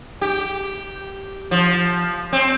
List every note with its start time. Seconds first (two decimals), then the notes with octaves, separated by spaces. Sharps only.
0.21 G4
1.51 F3
2.33 C4